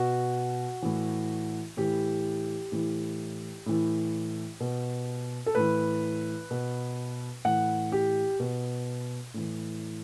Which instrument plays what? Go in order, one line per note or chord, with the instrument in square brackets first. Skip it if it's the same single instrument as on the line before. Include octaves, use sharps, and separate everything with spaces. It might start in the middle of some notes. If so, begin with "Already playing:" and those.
Already playing: [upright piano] B2 F#4
A2 E3
A2 E3 G4
A2 E3
A2 E3
B2
A4
A2 E3 B4
B2
A2 E3 F#5
G4
B2
A2 E3